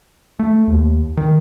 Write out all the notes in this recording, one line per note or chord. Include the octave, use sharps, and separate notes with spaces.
A3
D#2
D#3